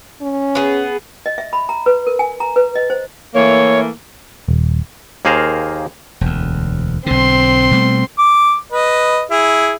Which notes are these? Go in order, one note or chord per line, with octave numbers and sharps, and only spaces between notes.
C#4
B3 G#4
D#5
E5
B5
A#5
B4
A#4
G#5
A#5
B4
D#5
C5
E3 A3 A#3 C#5
D#1
D#2 A#3 G#4 C5 F5 A#5
E1 D2
B1 D3 C4 C6
B2 G3 A3
D6
B4 D#5
E4 G#4